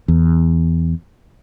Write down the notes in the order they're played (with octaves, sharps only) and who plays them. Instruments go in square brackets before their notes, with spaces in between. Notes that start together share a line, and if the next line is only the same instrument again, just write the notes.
[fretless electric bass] E2